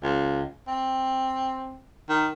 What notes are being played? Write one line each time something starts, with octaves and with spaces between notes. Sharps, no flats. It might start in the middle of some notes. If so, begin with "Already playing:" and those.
C#2
C4
D#3